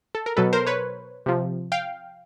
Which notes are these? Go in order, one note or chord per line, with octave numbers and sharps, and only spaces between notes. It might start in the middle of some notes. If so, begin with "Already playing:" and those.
A4
A#4
B2 F#3 A4 B4
A#4 C5
B4 C#5
C3 F3
F5 G5